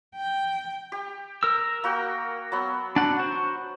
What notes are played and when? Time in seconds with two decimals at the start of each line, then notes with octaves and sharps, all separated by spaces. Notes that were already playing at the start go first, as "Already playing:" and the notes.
0.15 G5
0.92 G4
1.43 A#4 E6
1.84 A#3 F#4 G5
2.52 F#3 B3
2.96 D4 F#5
3.19 F#4 C5